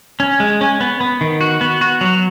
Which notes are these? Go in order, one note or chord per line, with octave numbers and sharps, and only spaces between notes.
C#4
G#3
C#4
B3
B3
D#3
F#4
B3
F#4
F#3